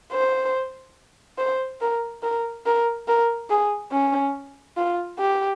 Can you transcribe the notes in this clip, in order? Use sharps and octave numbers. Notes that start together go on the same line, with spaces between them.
C5
C5
A#4
A#4
A#4
A#4
G#4
C#4
F4
G4